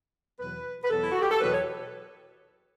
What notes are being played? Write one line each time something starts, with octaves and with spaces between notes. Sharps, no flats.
E2 B2 F#3 B4
B4
E2 B2 F#3 B3 A4
E4
F#4
G4
A4
E2 B2 F#3 B3 B4
C#5